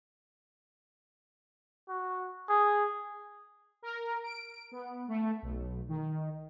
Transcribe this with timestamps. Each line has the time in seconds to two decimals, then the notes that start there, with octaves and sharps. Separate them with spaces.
1.89 F#4
2.49 G#4
3.82 A#4
4.24 D7
4.72 B3
5.08 A3
5.42 B1
5.89 D#3